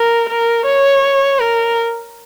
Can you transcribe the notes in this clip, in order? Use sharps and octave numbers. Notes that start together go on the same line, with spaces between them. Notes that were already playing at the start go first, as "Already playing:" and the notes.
Already playing: A#4
A#4
C#5
A#4